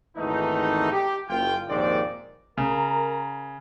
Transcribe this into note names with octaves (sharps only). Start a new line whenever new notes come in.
G#1 E2 E3 A3 D#4
G4
F#1 F4 G5
A#1 D#2 G#2 C4 D5
C#3 A#4 A#5